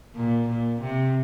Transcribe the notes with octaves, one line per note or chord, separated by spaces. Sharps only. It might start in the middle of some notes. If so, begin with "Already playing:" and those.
A#2
A#2
C3